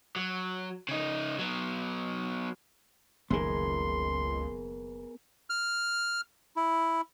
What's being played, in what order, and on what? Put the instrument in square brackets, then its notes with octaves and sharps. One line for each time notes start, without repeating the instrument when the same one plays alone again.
[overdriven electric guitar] F#3
C#3 D#4
F#3 B3
[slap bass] F#1 D#3 [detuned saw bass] C#2 [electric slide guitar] B3 G#4 A#4 [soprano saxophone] C6
[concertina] F6
E4